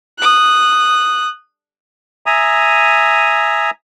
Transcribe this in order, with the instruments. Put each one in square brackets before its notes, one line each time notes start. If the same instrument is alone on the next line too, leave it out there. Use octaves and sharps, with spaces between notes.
[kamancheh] D#6 F#6
[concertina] E5 G#5 A#5 D#6